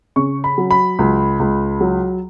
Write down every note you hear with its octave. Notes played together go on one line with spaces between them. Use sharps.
C#3 C#6
B5
F#3
B5
C#2
C#2
F#3